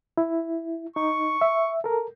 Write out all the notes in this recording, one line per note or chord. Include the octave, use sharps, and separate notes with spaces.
E4
D#4 C#6
E5
A4 A#4